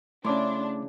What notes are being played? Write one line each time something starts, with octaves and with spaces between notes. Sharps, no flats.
C#3 A3 D4 E4 C6 D6